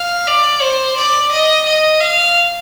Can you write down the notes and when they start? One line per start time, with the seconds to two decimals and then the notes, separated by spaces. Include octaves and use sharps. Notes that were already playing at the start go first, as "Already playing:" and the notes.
Already playing: F5
0.27 D5
0.61 C5
0.97 D5
1.32 D#5
1.66 D#5
2.00 F5